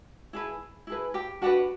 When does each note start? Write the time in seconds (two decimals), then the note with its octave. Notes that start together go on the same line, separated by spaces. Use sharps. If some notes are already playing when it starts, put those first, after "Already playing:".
0.33 E4 G#4 B4
0.87 E4 G#4 B4
1.14 G4 G5
1.42 D4 F#4 G4 B4 F#5